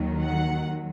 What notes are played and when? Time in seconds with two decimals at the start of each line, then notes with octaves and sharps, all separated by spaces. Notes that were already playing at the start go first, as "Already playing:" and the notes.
Already playing: D#2 D#3 F#3
0.22 F#5